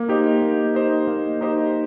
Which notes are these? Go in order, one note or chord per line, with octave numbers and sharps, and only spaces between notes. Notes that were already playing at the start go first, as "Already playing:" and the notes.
Already playing: A#3
D#4 G4 C5 D#5
A#3
D#4 G4 C5 D#5
A#3
D#4 G4 C5 D#5